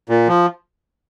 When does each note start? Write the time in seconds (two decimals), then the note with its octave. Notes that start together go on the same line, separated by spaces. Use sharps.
0.09 A#2
0.28 F3